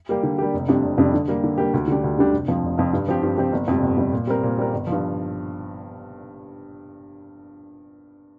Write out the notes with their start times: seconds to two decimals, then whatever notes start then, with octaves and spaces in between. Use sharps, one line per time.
0.09 G3 A#3 G4
0.23 D3
0.38 G3 A#3 G4
0.54 F1
0.68 F2 C3 G3 D4
0.83 F1
0.98 F2 C3 G3 D4
1.14 D3
1.28 G3 A#3 G4
1.44 D3
1.58 G3 A#3 G4
1.74 D2
1.88 D3 G3 D4 G4
2.04 D2
2.18 D3 G3 D4 G4
2.33 F1
2.48 F2 F3
2.64 F1
2.78 F2 F3
2.93 G2
3.08 F3 C4 G4
3.23 G2
3.38 F3 C4 G4
3.52 G1
3.68 F2 C3 G3
3.82 G1
3.97 F2 C3 G3
4.13 A#2
4.27 G3 C4 A#4
4.43 A#2
4.58 G3 C4 A#4
4.73 G1
4.87 F3
4.92 G2